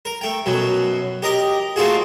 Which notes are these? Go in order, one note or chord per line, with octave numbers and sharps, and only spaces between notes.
A#4
A3 G5
F#2 B2 F#3
G4 A#4 D#5 A#5
A3 A#3 C4 F4 F#4 G#4